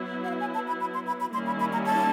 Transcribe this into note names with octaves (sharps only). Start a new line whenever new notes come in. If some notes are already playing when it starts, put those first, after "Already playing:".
Already playing: F#3 B3 E4
F#5
F5
G#5
A5
B5
B5
C6
B5
B5
D#3 G3 A#3 C#4 E4 C6
B5
B5
A#5
A5